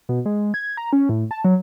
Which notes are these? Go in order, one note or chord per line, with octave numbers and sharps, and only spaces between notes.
B2
G#3
G#6
A#5
C#4
A2
A5
F#3